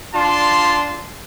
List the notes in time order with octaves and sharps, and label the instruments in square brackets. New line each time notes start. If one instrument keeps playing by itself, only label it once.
[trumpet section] D4 F4 A5 C6